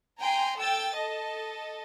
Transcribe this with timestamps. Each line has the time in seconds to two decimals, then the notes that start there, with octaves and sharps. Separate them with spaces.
0.20 G5 G#5 A#5 C6
0.57 A4 G5 E6 A6
0.94 A4 D#5 A5